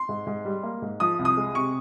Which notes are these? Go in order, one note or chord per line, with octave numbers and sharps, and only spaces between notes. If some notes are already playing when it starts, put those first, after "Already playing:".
Already playing: C6
G#2
G#2
G3
A#3
G#2
F3 D#6
C2
D#6
G#3
C3 C#6